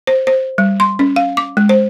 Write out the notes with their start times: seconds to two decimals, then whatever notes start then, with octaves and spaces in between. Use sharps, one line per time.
0.07 C5
0.27 C5
0.58 G3
0.80 C6
0.99 C#4
1.16 F5
1.37 D6
1.57 G#3
1.69 C5